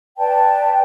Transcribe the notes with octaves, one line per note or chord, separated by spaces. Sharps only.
B4 D5 G5 A5